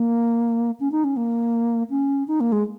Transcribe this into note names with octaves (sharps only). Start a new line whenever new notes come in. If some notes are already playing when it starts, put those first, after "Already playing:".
Already playing: A#3
C#4
D#4
C#4
A#3
C#4
D#4
A#3
G#3